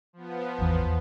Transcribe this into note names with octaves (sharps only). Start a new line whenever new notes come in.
F3 B3
G#1 E2